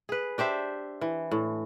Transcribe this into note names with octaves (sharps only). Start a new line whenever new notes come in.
G#4 B4
D4 G4 C5 E5
E3
A2